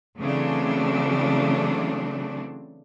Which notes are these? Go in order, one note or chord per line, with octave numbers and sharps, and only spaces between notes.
C#3 E3 F#3 A3 C4 D4